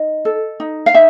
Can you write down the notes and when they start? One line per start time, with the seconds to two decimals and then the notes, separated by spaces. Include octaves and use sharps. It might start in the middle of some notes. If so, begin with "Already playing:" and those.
Already playing: D#4 D#5
0.25 A4
0.60 D#4
0.86 F5
0.94 D#4 E5